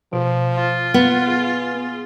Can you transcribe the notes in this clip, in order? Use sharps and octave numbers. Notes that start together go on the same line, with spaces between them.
B2 F3
F4
B3
G#4